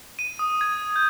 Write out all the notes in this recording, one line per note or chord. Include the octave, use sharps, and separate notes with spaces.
D#7
D#6
G#6
G6